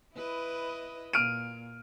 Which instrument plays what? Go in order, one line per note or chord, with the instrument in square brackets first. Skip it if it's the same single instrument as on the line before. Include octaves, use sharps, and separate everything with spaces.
[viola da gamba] E4 B4 D#5
[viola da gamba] A#2 [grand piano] F6 D7 D#7